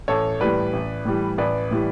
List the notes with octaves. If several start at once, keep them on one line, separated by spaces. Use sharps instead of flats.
A1 A4 C#5
A2 E3 G3 B4 D5
A1
A2 E3 G3
A1 B4 D5
A2 E3 G3